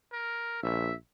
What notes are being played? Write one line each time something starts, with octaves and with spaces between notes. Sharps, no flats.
A#4
A#1 E5